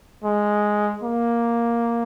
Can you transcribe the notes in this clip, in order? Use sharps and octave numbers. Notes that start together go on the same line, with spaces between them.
G#3
A#3